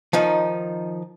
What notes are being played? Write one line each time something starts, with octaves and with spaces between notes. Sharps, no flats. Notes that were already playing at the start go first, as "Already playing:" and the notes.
D#3 F3 D#4